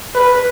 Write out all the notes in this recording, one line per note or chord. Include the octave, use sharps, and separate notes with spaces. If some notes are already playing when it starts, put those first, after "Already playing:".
B4